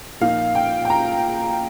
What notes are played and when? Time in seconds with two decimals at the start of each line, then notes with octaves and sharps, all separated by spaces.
0.20 A#2 F3 A#3 D#4 F5
0.55 G5
0.85 G5
0.90 A#5